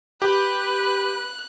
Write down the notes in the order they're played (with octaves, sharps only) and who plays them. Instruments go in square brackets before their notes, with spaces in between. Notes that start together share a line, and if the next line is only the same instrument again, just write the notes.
[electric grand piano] G4 [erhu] B4 [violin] F#6